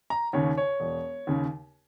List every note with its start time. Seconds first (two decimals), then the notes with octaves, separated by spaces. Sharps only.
0.10 A#5
0.33 D#2 C#3 C#5
0.58 C#5
0.80 E1
1.27 D#2 C#3